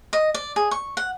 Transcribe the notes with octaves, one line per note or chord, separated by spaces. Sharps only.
D#5
D5
G#4
C#6
F#5